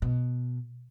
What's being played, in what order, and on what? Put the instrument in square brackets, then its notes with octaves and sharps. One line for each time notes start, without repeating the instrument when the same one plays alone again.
[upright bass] B2